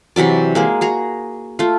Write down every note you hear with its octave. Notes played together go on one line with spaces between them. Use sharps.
C3 E3 F#3 D5
G#3 A#3 G#4
F#4 G#4 A#5
A3 F4